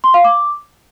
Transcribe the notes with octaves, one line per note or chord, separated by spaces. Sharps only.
C6
F5
D6